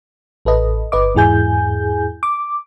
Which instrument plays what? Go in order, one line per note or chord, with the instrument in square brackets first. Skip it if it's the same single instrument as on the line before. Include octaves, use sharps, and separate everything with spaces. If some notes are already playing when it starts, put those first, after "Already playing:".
[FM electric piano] A1 A4 B4 D#5
G1 B4 D#5 D6
E2 G#2 E4 G#4 G#5 G6
D6